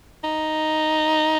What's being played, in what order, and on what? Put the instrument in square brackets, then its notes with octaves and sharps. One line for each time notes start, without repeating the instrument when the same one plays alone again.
[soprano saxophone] D#4